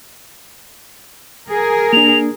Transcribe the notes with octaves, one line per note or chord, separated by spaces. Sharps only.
G#4 A#4
A#3 D4 F7